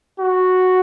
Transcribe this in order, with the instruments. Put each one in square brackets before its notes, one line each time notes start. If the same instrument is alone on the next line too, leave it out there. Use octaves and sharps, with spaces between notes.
[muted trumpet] F#4